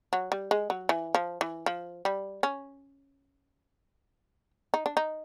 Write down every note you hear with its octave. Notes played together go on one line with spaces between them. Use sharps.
F#3
G3
G#3
F#3
E3
F3
E3
F3
G3
C#4
D#4
D4
D#4